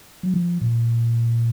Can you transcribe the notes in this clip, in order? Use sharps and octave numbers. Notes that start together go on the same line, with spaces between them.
F#3
F3
A#2